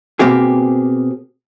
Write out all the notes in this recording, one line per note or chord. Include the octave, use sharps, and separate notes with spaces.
B2 A#3 C4 G4 G#4